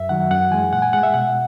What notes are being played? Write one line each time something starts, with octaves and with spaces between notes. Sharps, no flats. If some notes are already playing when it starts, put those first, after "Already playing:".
Already playing: F#2 E5
D#3 F#3 F#5
F#2 F#5
E3 G#3 G#5
A#2 F#5
G#5
G#3 F#5
E5
B2 F#5